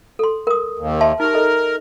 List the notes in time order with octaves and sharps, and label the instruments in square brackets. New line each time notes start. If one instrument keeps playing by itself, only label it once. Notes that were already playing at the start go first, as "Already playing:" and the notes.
[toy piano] A4 C6
A#4 D#6
[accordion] D#2
[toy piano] E5 A5 C6
[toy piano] D#4 G4 [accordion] A#4
[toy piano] A4 D#5